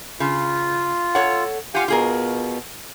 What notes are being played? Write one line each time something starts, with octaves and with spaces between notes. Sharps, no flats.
C#3 F4
A4 C#5 F#5
F4 G4 F5 F#5 G#5
B2 F4 G#4 A#4